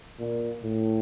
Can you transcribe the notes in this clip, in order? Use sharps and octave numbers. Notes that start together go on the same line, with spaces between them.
A#2
A2